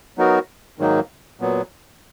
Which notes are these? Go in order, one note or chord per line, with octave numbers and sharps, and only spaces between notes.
F#3 B3 D#4 F#4 A#4
G#2 D#3 F#3 A#3 D#4
A#2 F#3 B3